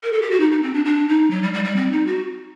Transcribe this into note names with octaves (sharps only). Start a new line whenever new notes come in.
A#4
A4
G4
F#4
D#4
D#4
C4
D4
D4
D#4
F#3
G3
G3
G3
C4
D#4
F#4